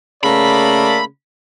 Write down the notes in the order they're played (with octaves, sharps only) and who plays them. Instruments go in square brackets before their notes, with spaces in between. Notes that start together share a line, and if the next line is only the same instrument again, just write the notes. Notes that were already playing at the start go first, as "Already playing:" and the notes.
[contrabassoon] C#3 [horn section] A3 A#3 D5 [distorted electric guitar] B5